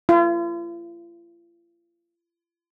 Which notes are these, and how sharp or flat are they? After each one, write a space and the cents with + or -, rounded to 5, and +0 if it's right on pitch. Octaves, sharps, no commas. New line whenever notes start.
F4 -40